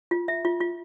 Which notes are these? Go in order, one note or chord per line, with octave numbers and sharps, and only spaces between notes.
F4
E5
F4
F4